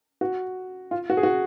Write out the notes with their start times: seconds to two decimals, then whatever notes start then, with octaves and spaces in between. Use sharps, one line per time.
0.21 F#4
0.91 F4
1.10 F#4
1.17 G#4
1.23 F#4